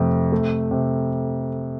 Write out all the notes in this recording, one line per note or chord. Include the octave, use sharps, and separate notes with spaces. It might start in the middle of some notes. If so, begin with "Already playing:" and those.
Already playing: F2 C3 A3
A3
C3